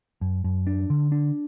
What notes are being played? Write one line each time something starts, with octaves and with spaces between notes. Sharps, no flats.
F#2
F#2
D4
D3
D4